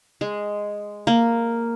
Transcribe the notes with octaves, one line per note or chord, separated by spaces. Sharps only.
G#3
A#3